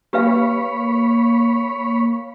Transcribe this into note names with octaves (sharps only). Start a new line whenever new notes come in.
A#3 G4 B4 C#5 F5 B5